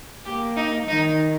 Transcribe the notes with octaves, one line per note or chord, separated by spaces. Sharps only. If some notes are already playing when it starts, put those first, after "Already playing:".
A#3 G4
D#4
D#3 D#4